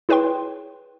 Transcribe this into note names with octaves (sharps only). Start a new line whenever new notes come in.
E4 G#4 B4 C#5 G5 C6